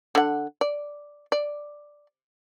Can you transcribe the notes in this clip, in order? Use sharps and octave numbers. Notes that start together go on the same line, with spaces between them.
D3 F#5
D5
D5